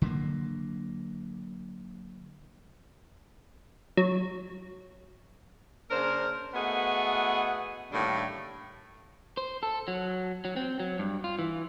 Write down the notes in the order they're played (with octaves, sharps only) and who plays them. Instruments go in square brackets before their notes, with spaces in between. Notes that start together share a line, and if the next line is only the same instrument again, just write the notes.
[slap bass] D3 F#3 A#3
[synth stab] F#3
[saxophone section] C#3 A#3 D4 A#4 C5
A3 B3 F#4 G#4 D#5 F#5
A2 D3 D#3 G3 A#3 D4
[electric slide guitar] C5
A4
F#3
F#3
C4
F#3
G2
F4
E3